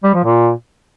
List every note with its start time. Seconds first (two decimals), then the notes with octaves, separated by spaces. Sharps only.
0.04 G3
0.14 F3
0.24 A#2